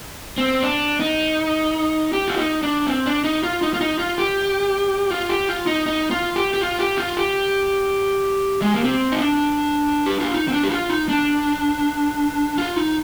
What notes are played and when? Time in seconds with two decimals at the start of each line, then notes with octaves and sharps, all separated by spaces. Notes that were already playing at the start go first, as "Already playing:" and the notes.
0.38 C4
0.63 D4
1.00 D#4
2.13 G4
2.28 F4
2.37 D#4
2.63 D4
2.87 C4
3.06 D4
3.24 D#4
3.43 F4
3.62 D#4
3.74 F4
3.81 D#4
3.99 F4
4.18 G4
5.11 F4
5.29 G4
5.49 F4
5.67 D#4
5.86 D#4
6.11 F4
6.36 G4
6.54 G4
6.61 F4
6.79 G4
6.98 F4
7.17 G4
8.62 G#3
8.74 A#3
8.84 C4
9.12 D#4
9.21 D4
10.06 G4
10.20 F4
10.34 D#4
10.48 C4
10.53 D4
10.64 G4
10.70 F4
10.89 D#4
11.09 D4
12.58 F4
12.76 D#4